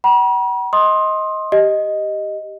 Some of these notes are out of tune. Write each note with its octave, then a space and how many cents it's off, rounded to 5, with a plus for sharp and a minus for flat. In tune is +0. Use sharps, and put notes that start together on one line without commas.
F#5 +45 B5 -45
D#5 +15 C6 +20 D#6 +0
G4 +0 D#5 +0